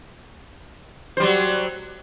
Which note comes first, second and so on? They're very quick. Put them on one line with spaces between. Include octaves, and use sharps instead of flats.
C5 G3 F#3